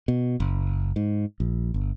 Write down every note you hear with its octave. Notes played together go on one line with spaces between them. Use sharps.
B2
F#1
G#2
A#1
G1